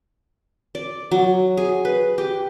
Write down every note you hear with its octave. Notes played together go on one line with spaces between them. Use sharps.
D5
F#3
G#4
B4
G4